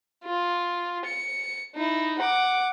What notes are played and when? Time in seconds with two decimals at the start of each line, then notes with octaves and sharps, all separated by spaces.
0.25 F4
1.05 C#7
1.75 D#4 E4
2.19 F#5 D6